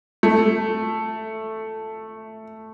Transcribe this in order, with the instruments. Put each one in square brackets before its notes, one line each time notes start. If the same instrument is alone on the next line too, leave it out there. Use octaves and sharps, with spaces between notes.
[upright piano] A3